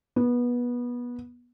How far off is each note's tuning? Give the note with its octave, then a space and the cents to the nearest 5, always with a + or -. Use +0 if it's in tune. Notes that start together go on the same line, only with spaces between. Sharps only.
B3 -20